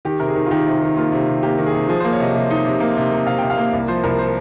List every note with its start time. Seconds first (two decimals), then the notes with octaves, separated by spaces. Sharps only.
0.05 D#3 G4
0.20 C3 A#4
0.28 G#4
0.35 D#3
0.46 F4
0.51 D#3 G4
0.66 C3
0.82 D#3
0.96 A#3 F4
1.12 C3
1.28 C3
1.43 A#3 G4
1.58 D#3
1.66 G#4
1.74 C3
1.89 F3 G#4
2.00 C5
2.04 A#3
2.12 C#5
2.19 C3 D#5
2.35 C3
2.50 D#4
2.66 C3
2.80 A#3
2.97 C3
3.12 A#3
3.27 C3 F5
3.38 C3 G5
3.50 F5
3.58 A#3
3.73 C2
3.88 F3 C5
4.03 C2 A#4
4.18 C5